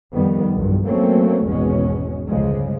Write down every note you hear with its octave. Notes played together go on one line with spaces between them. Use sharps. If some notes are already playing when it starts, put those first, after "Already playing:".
F2 D#3 G3 B3
B1 E2 G2
F#3 A3 A#3 C4 C#4
G#1 E2 B2 G#3 C#4
G1 C#2 C#3 F3 G#3